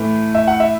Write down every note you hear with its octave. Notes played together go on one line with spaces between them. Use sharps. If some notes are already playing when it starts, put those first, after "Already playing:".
Already playing: A2 E3 A3
E5
F#5
E5